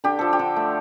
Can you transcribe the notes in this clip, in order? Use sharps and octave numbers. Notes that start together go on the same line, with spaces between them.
D3 G4
F3 A4
G4
D3
A3